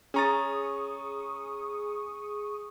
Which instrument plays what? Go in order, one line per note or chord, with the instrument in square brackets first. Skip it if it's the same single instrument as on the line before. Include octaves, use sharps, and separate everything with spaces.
[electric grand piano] C#4 A#5 A6 [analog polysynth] G#4 C#6 D#6